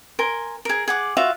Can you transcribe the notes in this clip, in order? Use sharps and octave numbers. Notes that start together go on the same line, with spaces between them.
A#4 G#5 C6
G#4 A#4
G#4 F#5 D6
F4 F#4 E5 F5